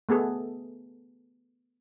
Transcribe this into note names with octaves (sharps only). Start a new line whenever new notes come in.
A3 B3 G#4 A4